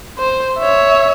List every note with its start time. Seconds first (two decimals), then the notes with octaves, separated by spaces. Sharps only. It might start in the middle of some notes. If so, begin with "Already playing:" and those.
0.19 C5
0.58 C#5 E5